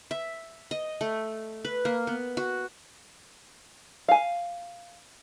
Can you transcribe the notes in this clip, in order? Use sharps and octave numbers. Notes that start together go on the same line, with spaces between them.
E5
D#5
A3
B4
A#3
B3
F#4
F5 G#5